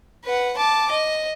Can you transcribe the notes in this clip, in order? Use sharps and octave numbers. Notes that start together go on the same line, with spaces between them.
B4 F#5
A5 D6
D#5